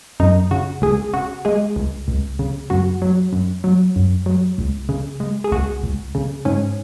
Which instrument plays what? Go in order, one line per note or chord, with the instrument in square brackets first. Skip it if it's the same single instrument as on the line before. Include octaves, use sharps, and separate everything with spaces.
[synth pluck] F#2 D#4
C#3 F#4
C#2 G#4
C#3 F#4
G#3 G#4
C#2
C#2
C#3
F#2 F#4
F#3
F#2
F#3
F#2
F#3
C#2
C#3
G#3
G#4
C#2 F#4
C#2
C#3
G#2 C#4